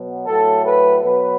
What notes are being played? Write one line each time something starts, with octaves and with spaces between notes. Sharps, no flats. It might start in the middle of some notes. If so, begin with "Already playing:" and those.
Already playing: B2 F#3
A2 F#3 A4
B4
B2 F#3 B4